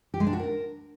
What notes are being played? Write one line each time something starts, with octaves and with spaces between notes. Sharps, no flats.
G4
G#3
D4
F#4
A#4